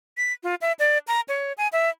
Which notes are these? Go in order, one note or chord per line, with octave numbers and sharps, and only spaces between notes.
B6
F4
E5
D5
A#5
C#5
G#5
E5